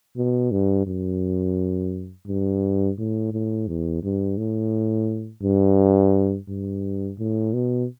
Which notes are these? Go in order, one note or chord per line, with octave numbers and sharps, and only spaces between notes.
B2
G2
F#2
G2
A2
A2
E2
G2
A2
G2
G2
A2
B2